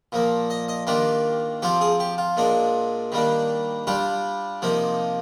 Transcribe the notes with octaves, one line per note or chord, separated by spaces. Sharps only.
A#2 F3 A#3
D#5
D#5
D#3 A#3 D4 F4 G4
F3 C4 F4 G4
G#4
G4
F4
A#2 G#3 D4 F4
D#3 G3 A#3 D4
G3 D4 F4 G4
C3 F3 A#3 D#4